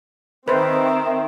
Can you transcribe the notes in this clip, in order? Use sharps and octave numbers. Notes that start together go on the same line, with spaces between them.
D#3 C4 B4 C5 E5